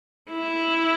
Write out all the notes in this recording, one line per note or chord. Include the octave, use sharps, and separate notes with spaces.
E4